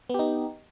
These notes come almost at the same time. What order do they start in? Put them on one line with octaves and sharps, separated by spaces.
B3 G4 D#4